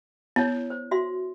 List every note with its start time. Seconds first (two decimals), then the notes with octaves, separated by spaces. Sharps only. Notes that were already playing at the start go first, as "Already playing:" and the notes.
0.36 B3 E4 C#5
0.70 C5
0.91 F#4 E5 C6